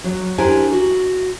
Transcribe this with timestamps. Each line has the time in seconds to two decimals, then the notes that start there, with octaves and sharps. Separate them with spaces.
0.04 F#3
0.38 D4 E4 G4 A#4 C5 G#5
0.72 F#4